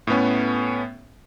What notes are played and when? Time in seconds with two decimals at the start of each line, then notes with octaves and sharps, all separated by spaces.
0.07 A2 A3 B3 C#4